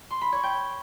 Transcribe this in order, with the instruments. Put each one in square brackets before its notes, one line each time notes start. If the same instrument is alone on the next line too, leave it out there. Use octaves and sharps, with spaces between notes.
[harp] C6
B5
C#5
G5